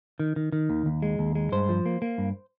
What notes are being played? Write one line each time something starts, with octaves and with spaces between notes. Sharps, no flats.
D#3
D#3
D#3
D#2
D#2
G#3
D#2
G#3
G2 C5
F3
A#3
A#3
G2